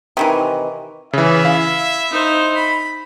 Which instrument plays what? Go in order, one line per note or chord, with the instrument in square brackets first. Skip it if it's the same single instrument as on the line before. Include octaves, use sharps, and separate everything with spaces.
[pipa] C3 D#3 E3
[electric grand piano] C#3 E3 [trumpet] E5
[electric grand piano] E4 F5
[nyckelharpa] D#4 C5
B5